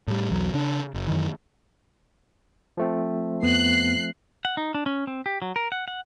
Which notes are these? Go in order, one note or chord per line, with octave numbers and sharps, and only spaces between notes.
A2 G3
B1 E2 F#3
C#3 D4
F#1
F#2 D#3 E3
F3 A3 C4
F2 B3 F#6 C7
F#5
D#4
D4
C#4
C4
G4
F#3
A#4
F#5
F#5